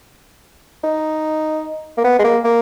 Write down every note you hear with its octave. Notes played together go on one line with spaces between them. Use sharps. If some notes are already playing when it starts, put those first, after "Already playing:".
D#4
A#3
B3
G#3
A#3
A#3